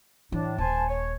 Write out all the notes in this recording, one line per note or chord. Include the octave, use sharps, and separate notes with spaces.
A2 E3 D4
D#1 C5 G#5 A5
C#5